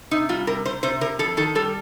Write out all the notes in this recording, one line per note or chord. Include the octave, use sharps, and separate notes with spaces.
C3 D#4
G3 F4
C3 A#4
C3 C5
C3 C5
C3 A#4
F2 A4
D#3 A4
G3 A4